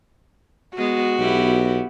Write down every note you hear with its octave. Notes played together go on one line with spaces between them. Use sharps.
G#3 B3 F#4
B1 B3 E4 G4